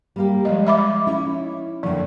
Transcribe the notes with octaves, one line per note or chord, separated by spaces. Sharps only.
G3 A#3 G4
F3 G#3 D#5 F5
E5 B5 D6
C#4 D#4 E4
F2 D3 F3 A#3